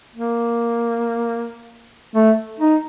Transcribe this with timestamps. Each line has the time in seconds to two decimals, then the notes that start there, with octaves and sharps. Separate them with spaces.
0.15 A#3
2.15 A3
2.60 D#4